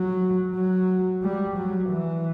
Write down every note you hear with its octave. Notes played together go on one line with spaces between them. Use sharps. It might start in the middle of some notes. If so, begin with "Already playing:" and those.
Already playing: F#3
F#3
G3
F#3
E3